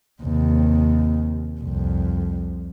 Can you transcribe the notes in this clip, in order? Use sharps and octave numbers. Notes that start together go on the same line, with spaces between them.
D#2 C3
C2 F2